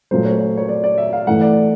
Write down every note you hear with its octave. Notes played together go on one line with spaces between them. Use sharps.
A#2 F#3 A3 C5
C#5
C#5
C#5
D5
D5
E5
F5
A2 E3 A3 F#5
D5